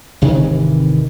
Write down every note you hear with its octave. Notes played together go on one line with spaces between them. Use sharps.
G#1 C3 D#3 E3